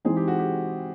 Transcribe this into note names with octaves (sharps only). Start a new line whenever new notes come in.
E3 G#3 C4 D#4 G#4
G4
F#4
G4